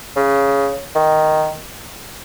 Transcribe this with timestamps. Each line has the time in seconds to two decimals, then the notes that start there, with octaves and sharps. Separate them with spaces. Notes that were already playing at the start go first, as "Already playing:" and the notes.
0.16 C#3
0.95 D#3